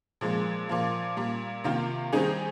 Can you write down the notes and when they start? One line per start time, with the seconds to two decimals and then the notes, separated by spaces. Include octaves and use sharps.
0.21 A#2 F3 G#3
0.69 A#2 F3 A#3
1.17 A#2 G3 A#3
1.64 C3 D#3 A#3 F4
2.13 D#3 G3 C4 D#4 G#4